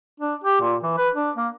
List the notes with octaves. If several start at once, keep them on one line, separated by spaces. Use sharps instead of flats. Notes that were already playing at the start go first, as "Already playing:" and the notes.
D4
G4
A#2
E3
B4
D4
A#3